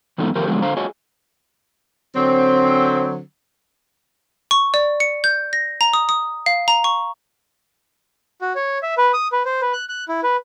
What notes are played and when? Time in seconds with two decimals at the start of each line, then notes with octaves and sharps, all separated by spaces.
0.18 E3 F#3 G#3 A3 B3 D#4
0.36 D#3 F3 A3 G4 A#4 C5
0.47 D3 F3 F#3 G#3 B3
0.62 D3 C5 F5 A#5
0.77 F#4 G#4 C#5 D#5 G#5
2.16 D3 F#3 C4
4.51 C#6
4.74 D5
5.00 C#7
5.24 G6
5.53 A#6
5.81 A#5
5.93 D#6
6.09 D#6
6.46 F5
6.68 A#5
6.84 C#6
8.41 F#4
8.55 C#5
8.83 E5
8.98 B4
9.14 D#6
9.32 B4
9.45 C5
9.61 B4
9.73 F#6
9.89 F#6
10.09 E4
10.23 B4